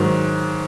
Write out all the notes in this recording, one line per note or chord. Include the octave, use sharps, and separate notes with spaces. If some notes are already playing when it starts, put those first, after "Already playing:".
Already playing: G#2 D#3 F#3